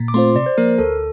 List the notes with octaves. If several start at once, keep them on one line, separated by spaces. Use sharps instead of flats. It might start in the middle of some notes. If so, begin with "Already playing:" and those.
Already playing: A#2
D6
A3 C4 F4 C5 C6
C3 D5
C5
F3 A#3 A#4
D2 A4